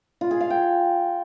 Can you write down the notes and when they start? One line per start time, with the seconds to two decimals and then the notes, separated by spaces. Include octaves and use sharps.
0.21 F4
0.31 G#4
0.41 F5
0.50 G5